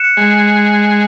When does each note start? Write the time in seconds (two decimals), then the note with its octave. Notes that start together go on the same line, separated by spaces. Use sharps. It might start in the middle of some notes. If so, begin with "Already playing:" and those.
Already playing: F#6 C#7 E7
0.17 G#3